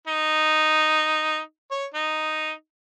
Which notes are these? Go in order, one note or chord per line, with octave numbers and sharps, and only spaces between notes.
D#4
C#5
D#4